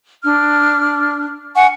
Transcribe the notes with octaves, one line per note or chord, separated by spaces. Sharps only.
D4 F6
F#5 G#5 C#6